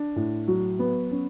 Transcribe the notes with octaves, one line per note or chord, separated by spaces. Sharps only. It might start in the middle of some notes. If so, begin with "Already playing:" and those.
Already playing: D4
A2
F#3
B3
C#4